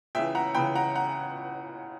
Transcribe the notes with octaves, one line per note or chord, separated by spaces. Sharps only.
C#2 C#3 E3 E5 G5
F#5 A#5
C#2 C#3 E3 G5 B5
F#5 A#5
F#5 A#5